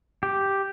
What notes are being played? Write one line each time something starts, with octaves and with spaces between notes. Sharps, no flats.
G4